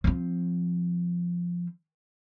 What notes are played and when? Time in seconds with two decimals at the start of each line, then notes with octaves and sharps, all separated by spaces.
0.04 F3 C4